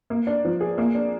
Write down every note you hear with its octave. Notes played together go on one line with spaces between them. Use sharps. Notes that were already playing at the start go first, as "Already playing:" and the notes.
A#3
D4
F3
G#4
A#3
D4